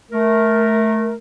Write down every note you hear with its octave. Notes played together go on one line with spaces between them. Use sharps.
A3 A#4